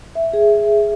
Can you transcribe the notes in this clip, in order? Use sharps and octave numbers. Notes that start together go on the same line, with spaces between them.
E5
G#4